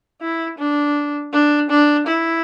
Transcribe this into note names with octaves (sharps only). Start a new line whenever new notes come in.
E4
D4
D4
D4
E4